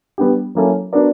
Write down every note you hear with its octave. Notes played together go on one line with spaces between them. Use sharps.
G3 B3 D4 G4
F#3 A#3 C#4 E4 A4
B3 D4 F#4 A#4 D5